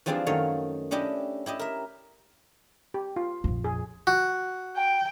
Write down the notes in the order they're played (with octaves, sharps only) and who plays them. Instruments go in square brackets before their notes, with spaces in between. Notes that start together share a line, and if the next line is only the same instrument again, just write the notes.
[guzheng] E3 F3 G3 C4 D4 G#4
F#2 D#3 A3 C#5 F5
C#4 D4 E4 G4 D#5
E4 G4 D#5
A#4 E5
[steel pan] G4
F4
[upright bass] A#1 F2
[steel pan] G#4
[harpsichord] F#4
[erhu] G5